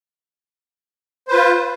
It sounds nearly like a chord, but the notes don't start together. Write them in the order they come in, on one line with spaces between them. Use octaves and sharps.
C5 B4 F4